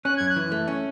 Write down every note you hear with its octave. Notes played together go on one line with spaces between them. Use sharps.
C#4 F#6
F#2 G#6
F#6
E3
A3
C#4